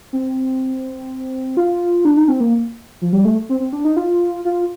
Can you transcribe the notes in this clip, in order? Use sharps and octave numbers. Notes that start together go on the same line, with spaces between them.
C4
F4
D4
D#4
C4
A#3
F3
G3
A3
C4
C4
D4
D#4
F4
F4